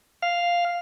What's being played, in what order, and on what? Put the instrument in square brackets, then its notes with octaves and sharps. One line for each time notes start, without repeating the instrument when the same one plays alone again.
[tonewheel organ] F5